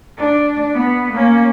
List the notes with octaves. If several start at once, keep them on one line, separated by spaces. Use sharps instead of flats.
D4
B3
A#3 C#4